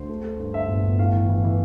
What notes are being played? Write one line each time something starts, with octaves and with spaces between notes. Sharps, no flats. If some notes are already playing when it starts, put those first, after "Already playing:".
Already playing: D2 C5
A3
A3
G2
D3 E5
G1
G1
A2 F5
E3
E3
E3